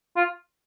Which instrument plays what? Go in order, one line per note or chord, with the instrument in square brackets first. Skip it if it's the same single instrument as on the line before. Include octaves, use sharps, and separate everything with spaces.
[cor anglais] F4